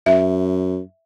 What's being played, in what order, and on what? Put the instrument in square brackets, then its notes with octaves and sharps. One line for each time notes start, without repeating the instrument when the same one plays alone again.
[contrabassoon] F#2 [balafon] E5